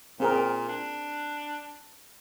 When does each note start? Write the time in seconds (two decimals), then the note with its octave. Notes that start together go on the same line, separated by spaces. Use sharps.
0.20 A#2 C4 G#4 A#4
0.68 D4